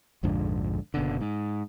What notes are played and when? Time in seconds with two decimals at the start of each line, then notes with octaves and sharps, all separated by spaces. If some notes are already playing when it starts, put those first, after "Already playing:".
0.23 A#1 F2 G#2 D3
0.94 F#1 B2 D3
1.21 G#2